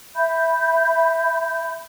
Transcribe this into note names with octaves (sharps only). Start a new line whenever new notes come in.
E5 B5 G6